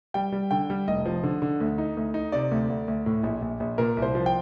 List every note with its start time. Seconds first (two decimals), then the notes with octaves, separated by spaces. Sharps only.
0.14 G3 G5
0.32 G3
0.51 D3 G5
0.70 G3
0.88 F1 D#5
1.06 F3
1.23 D3
1.42 D3
1.60 D2
1.78 D#4
1.97 D2
2.14 D#4
2.32 C3 D5
2.51 D2
2.70 D2
2.88 D2
3.06 A2
3.23 A#1
3.42 A#1
3.60 A#1
3.78 A#2 A#4
3.97 C2
4.02 C5
4.15 F3
4.26 G5